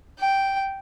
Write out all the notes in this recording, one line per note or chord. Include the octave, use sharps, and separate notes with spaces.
G5